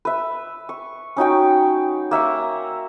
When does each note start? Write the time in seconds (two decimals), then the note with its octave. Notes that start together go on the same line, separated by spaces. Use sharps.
0.05 B4 E5
0.69 C#6
1.17 C#4 D#4 F#4 G5
2.11 A#3 E5 A#5 C#6